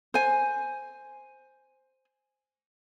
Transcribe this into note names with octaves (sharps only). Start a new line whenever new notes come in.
C5 G#5